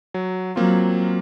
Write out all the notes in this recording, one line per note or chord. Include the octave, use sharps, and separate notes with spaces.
F#3
F#3 A#3 C4 F4